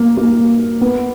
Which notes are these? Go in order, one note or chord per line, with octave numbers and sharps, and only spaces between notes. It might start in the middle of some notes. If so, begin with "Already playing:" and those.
Already playing: A#3
A#3
B3